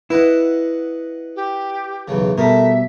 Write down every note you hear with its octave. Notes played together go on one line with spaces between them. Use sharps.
E4 B4 D#5 F#5
G4
B1 E2 C#3
B2 G3 A3 A#4 E5